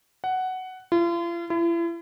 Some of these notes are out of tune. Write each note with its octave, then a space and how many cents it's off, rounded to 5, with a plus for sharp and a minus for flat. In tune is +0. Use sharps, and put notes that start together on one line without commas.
F#5 +10
F4 -40
E4 +40